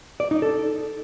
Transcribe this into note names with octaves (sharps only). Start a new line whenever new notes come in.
D5
D#4
A4